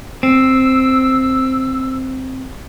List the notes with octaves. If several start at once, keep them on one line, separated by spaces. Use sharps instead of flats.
C4 E6